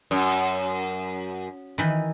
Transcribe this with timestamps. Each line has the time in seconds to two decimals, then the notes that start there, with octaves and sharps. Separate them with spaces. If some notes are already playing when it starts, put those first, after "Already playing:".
0.11 F#2
1.78 D#3 E3